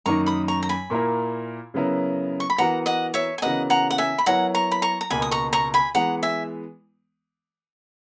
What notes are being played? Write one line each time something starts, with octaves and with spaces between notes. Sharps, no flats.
F#2 D#3 A#3 D#4 A#4 A#5 C#6
B5 D#6
A#5 C#6
A#5
G#5 B5
A#2 A#3 E4 A#4
C#3 F#3 B3 E4 A#4
C#6
B5
E3 B3 F#4 A#4 F#5 A#5
D#5 F#5
C#5 E5
G#5
C#3 E3 B3 F#4 A#4 D#5 F#5
F#5 A#5
F#5
E5 G#5
B5
F#3 B3 E4 A#4 C#5 F#5 A#5
A#5 C#6
B5
A#5 C#6
A#5
C#2 B2 A#3 G#5 B5
D#6
A#5 C#6
A#5 C#6
G#5 B5
E3 G#3 B3 F#5 A#5
E5 G#5